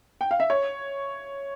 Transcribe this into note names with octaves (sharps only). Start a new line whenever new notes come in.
G5
F5
E5
C#5